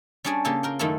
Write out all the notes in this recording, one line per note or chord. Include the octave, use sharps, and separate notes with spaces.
G3 C#4 D4 G#4 D5
C#3 A#3 G4 A4
F4 A#4 G5
F#2 D#3 A3 E4 F4 A4